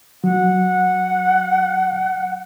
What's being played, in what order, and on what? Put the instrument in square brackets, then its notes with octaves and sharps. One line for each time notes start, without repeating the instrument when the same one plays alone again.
[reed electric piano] F#3 [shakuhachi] F#5